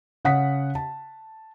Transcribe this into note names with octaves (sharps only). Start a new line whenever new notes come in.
C#3 F#5 D#6 B6
A5